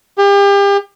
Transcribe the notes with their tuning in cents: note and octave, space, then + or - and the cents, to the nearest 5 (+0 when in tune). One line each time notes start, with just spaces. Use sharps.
G4 +35